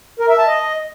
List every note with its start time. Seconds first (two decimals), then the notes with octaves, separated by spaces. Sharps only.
0.20 A#4
0.29 E5
0.38 A5
0.48 D#5